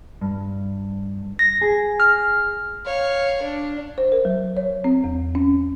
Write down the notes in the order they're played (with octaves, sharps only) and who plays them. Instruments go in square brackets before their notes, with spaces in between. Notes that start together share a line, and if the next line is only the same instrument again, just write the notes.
[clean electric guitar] G2
[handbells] A#6
[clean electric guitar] G#4
[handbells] F6
[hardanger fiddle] C#5 F5
D4
[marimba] C5
A#4
F#3
C#5
C4
E2
C#4